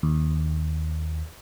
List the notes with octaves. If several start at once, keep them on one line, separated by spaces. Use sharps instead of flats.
D#2